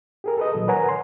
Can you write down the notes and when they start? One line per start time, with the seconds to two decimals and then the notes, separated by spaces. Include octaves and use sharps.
0.24 G4 G#4 A#4
0.38 A4 B4 D#5
0.55 A#2 D#3 F#3
0.67 A#4 B4 C#5 F#5 G#5 A#5
0.89 C6